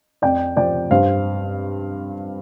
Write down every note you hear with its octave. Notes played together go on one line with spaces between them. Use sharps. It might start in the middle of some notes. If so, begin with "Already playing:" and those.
F2 D5 G5
C3 F3 D5 G5
G2 C5 F5